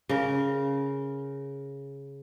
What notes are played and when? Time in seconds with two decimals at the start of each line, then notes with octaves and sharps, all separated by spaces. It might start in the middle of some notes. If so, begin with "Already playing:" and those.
0.09 C#3 A#4